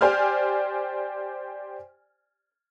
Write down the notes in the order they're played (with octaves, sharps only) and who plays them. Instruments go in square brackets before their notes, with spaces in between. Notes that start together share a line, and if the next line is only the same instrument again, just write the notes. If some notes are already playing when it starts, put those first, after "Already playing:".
[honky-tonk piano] G4 C5 D5 G#5 F6